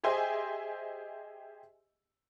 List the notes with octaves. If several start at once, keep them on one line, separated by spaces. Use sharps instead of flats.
G4 G#4 C5 D#5 E5 G#5